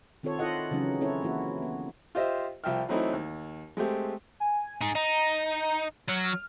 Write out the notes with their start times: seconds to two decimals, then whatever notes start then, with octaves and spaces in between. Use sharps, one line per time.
0.23 D#3 C4 F4 A4 C#5
0.39 E4 F4 A4 D#5 F#5
0.71 C#3 E3 F#3 C#4 D#4
1.01 C4 C#4 E4 A4 C#5
1.22 E3 A#3 E4 F#4
1.62 B3
2.15 F4 G4 C5 D#5 E5
2.64 C2 F3 E5 G5 F6
2.89 E3 F#3 A3 C4 D#4 E4
3.13 D#2
3.77 G#3 A3 C4 G4
4.40 G#5
4.81 D#4 G#4
4.95 D#4 A#5
6.08 F#3 F6